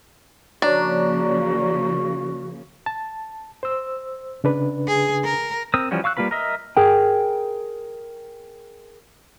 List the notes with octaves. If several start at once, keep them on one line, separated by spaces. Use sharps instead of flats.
C#3 F3 A#3 D4 F#4 C#5 D5 A#5
A5
C5 E6
C#3 D4 B4
G#4
A#4
C4 A#4 D#6 E6
E3 F3 G3 C#4 F#4
F5 C#6 E6 F#6
G3 A#3 F4 B4 B5
A#4 D#5 E5
G#4 A#4 G5